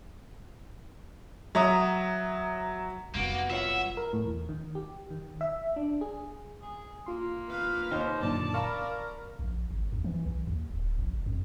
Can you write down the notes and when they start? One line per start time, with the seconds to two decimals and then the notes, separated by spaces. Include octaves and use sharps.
1.55 F#3 E5 A#5 D#6
3.14 F1 G3 A#3 B3 F#4
3.50 F4 C#5 E5 F#5
3.97 A#4
4.13 A2
4.25 E2
4.49 D#3
4.75 G4
5.11 D#3
5.41 E5
5.76 D4
6.01 G#4
6.62 G#4
7.06 A#3 F4 C6
7.50 B4 F5
7.91 D#2 D#4 C5
8.22 F#2 A#2 D3 D5 A5
8.54 A#4 F5 A5 B5 C#6 F6
9.39 A#1
9.71 G#1
9.92 E2
10.04 E3
10.26 B1
10.47 D#2
10.70 D1
10.99 A#1
11.14 F1
11.26 F2